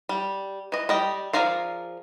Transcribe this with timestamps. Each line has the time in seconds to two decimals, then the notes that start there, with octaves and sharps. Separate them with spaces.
0.09 G3
0.72 E3 D#5
0.89 G3 D#5 G5
1.33 F3 G#4 A#4 D5 F5